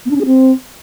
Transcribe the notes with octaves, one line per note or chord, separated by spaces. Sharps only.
B3
D4
C#4
G#4
C4